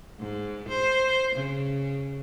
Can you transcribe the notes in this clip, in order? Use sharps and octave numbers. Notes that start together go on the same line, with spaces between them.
G#2
C5
C#3